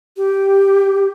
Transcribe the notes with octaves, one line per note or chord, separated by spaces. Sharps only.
G4